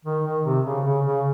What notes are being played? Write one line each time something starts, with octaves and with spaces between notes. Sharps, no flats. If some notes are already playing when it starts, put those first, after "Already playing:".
D#3
D#3
C3
C#3
C#3
C#3